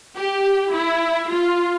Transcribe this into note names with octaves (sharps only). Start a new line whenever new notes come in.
G4
E4
F4